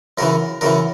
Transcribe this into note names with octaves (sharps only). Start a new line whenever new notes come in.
F#2 C#3 E3 A#4
F#2 C#3 E3 A#4